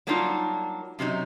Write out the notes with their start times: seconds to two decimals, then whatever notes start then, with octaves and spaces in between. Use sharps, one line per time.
0.07 F#3 G3 A#3 D4 D#4 F4
0.99 F#2 C3 F#3 D#4